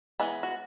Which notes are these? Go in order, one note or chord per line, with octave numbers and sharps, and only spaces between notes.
E3 G#3 B3
F#4